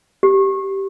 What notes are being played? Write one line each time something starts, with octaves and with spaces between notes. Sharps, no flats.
G4